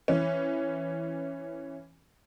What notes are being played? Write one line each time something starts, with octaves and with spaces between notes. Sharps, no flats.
E3 C#4